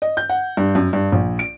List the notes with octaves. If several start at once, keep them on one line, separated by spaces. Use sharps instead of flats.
D#5
G6
F#5
G2
F#2
G2
A#1
D7